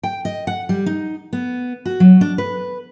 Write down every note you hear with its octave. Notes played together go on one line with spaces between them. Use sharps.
G5
D#5
F#5
G3
D#4
B3
F#4
F#3
D4
B4